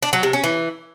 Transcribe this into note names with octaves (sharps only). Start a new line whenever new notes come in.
D4
F#3
C3
C#4
E3